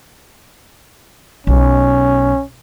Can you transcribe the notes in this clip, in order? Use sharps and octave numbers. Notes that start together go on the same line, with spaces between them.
B1 C#4